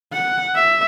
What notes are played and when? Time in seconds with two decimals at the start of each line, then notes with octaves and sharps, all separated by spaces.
0.13 F#5
0.55 E5